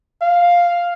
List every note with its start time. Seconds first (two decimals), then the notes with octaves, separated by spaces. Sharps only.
0.22 F5